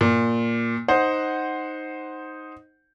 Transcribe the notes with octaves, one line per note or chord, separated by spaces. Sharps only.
A#2
D#4 C5 F#5